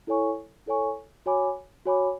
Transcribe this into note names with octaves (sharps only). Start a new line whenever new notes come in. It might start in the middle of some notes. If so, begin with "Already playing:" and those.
E4 A4 C#5 G#5 C#6
E4 A4 C#5 G#5 C#6
F#4 C#5 G#5 B5 D6
F#4 C#5 G#5 B5 D6